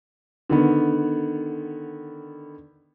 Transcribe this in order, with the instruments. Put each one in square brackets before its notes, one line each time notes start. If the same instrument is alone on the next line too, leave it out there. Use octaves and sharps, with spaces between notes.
[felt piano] D3 D#3 B3